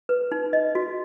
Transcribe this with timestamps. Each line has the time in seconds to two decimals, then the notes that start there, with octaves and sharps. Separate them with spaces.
0.09 B4
0.32 D#4
0.53 D#5
0.75 F#4